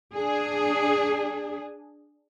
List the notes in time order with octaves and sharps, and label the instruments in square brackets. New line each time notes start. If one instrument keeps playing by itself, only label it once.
[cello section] D4 G#4